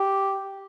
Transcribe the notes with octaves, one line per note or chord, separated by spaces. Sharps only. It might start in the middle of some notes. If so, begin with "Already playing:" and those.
Already playing: G4